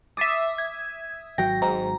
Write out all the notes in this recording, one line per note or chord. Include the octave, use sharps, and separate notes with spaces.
E5 D6 D#6 A6 C7
G#6
G#1 F#3 G5 A#6
G#2 A#5